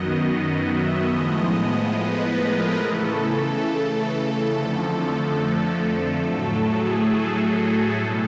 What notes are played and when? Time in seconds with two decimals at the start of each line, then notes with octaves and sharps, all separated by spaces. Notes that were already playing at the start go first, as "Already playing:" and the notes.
Already playing: F#2 D#3 F#3 B3 D#5
0.19 D#5
0.62 E5
1.05 A2 F3 G#3 B3 D#5
1.91 B4
2.35 A#4
2.77 C#3 E3 A3 A4
3.63 A4
4.50 F2 D3 F3 A3 A4
6.22 A2 F#3 A3 A4
6.65 G#4
7.08 A4
7.51 A4
7.95 B2 G3